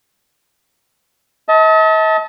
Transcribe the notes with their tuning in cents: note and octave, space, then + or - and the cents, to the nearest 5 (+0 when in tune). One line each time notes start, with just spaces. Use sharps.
D#5 +45 A5 +0